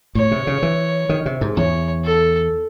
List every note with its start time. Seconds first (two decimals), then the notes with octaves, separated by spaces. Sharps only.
0.15 A2 C#5
0.31 C3
0.47 C#3
0.62 E3
1.09 D#3
1.26 C3
1.41 G#2
1.57 E2 C#5
2.04 A4